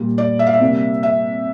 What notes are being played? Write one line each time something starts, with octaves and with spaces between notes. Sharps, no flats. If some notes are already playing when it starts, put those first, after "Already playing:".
Already playing: A#2 G3 A#3
D5
E5
F5
E5
C3 G3 A#3
E5